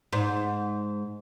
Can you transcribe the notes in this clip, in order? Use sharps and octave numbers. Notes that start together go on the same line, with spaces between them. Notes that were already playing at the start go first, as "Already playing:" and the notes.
G#2